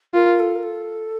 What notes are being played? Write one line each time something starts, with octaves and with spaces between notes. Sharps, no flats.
F4 A#4
A4
A#4
A4